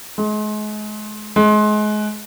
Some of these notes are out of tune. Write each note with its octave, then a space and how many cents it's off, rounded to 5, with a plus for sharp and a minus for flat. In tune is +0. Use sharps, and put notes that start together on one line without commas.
G#3 +35
G#3 +30